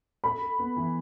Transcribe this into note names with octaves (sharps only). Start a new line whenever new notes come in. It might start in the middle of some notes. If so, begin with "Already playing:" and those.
A4 B5
A4
B3
E3